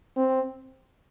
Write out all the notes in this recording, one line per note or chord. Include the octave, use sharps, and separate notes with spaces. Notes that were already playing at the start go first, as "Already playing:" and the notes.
C4